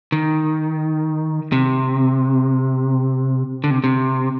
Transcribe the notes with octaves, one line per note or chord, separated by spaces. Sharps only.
D#3
C3
D3
C3
C3